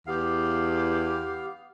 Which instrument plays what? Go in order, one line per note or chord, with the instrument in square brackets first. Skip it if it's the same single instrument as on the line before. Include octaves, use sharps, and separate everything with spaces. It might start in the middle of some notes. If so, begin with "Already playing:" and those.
[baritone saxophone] E2 [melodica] B3 F5 [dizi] G4